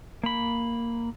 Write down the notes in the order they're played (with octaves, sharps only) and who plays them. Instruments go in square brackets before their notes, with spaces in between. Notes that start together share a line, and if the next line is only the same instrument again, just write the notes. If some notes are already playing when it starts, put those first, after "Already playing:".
[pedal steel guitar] A#3 B5